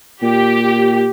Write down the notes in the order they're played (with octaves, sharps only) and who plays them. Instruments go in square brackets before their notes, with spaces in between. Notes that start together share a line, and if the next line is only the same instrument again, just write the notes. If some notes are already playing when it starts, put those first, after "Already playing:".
[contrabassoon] A#2 [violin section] G4